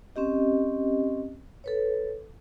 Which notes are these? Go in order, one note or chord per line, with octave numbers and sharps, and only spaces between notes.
C4 C#4 G4 D#5
A4 B4 C#5